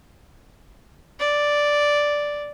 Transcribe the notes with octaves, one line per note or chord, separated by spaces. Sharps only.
D5